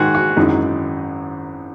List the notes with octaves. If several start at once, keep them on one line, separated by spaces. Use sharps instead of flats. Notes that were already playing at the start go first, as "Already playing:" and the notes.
Already playing: G#2 D#3 G#3 F#4 G#4
F#4
G#1 F#2 E3 G#3 D#4